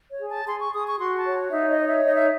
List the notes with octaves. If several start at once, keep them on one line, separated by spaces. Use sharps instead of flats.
C#5
G#4
A5
G#4 C6
C#6
G#4 D#6
C#6
F#4 C6
A5
C#5
D#4 E5
D#5
C#5
E5
D#4 D#5
E5